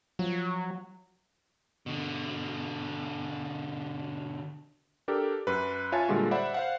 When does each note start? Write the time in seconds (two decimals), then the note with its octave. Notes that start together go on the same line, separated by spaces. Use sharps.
0.19 F3 F#3
1.86 B2 D3
5.08 D4 G4 A4 A#4
5.47 F#2 B4
5.92 F4 C#5 E5 G#5 A5 A6
6.08 A#2 D3 G3 G#3 F4 F#4
6.31 C5 D5 E5 F#5 B5
6.54 C5 F5 F#5